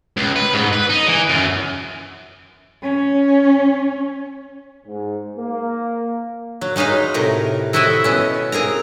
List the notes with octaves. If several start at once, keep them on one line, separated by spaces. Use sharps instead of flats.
C#2
B4
G#2
B4
D#4
E3
F#2
C#4
G#2
A#3
F#3
F#3 G#3 D#4 B4 F5
A2 C3 A#4
C4 E4 F#4 A4 D#5 E5
B2 B3 C#4
C4 G#4 A#4 A#5